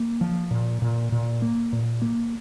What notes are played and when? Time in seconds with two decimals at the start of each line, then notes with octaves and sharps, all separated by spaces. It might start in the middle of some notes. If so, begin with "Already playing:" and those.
Already playing: A#3
0.21 F3
0.51 A#2
0.82 A#2
1.12 A#2
1.42 A#3
1.73 A#2
2.02 A#3